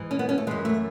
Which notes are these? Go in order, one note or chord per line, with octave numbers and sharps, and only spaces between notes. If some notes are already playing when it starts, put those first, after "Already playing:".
Already playing: G#2 E3
C#4
B3
C#4
A3
F#2 E3 G#3
A3